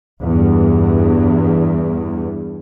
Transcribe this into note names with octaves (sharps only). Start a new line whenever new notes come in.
E2 G2